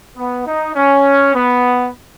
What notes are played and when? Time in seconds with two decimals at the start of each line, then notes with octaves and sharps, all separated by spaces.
0.17 B3
0.46 D#4
0.75 C#4
1.35 B3